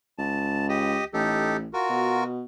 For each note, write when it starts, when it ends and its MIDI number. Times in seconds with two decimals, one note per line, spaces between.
0.18 1.00 37
0.18 0.67 81
0.69 1.04 67
0.69 1.04 75
1.14 1.68 33
1.14 1.57 63
1.14 1.57 67
1.14 1.57 69
1.73 2.24 65
1.73 2.24 66
1.73 2.24 70
1.90 2.44 47